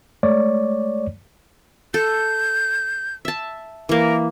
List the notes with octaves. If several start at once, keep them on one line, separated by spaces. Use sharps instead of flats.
G#3 A3 C#5 D5
A4 G6
E5 A5
E3 A#3 A#4